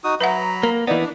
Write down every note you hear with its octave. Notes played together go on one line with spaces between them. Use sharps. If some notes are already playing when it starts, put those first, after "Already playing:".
D#4 F#4 D#6
F#3 B4 E5 F#5 A#5 B5
A#3
E3 A#3 B3 D#4 D5
D4